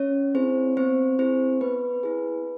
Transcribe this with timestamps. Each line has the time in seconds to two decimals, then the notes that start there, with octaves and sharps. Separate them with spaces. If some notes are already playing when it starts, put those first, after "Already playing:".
Already playing: C#4 C#5
0.35 C4 E4 G#4 C5
0.77 B3 C4 C5
1.19 C4 E4 G#4 C5
1.61 B3 B4
2.03 E4 G#4